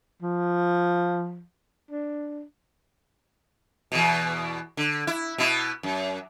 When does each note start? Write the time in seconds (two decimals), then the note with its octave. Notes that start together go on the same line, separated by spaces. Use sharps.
0.22 F3
1.91 D4
3.92 E2 B2
4.77 D3
5.07 E4
5.38 B2 B3 E4
5.83 F#2